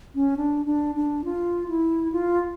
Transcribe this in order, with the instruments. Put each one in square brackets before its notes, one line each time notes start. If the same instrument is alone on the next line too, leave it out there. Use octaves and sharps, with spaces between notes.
[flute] C#4
D4
D4
D4
F4
E4
F4